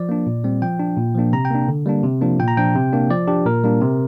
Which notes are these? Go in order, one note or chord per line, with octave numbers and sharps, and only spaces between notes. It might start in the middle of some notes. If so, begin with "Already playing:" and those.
Already playing: F3 D5
A#3 D4
A#2
G3 C4
F3 G5
D4
A#2
F3 A#3 D4
C3 A#5
G5
A#3 D4
D3
G3 A#3 D4
C3
F3 A#3 D4
A#2 G5
A#5
F3 D4 G5
C3
A#3 D4
F3 D5
D4 G4
A#2 A#4
G3 A#3 D4
C3